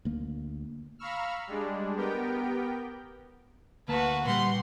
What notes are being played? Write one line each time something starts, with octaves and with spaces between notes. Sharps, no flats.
D2 A#3
F5 A#5 B5 C#6 E6 F6
G3 G#3 D4
B3 G4 A#4 G5
D2 A#3 F#4 B4 A5
A#2 G3 G4 F#5 C6